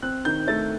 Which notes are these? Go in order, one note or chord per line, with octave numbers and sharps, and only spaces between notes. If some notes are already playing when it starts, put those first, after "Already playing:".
C4 F#6
D#3 G6
A3 A6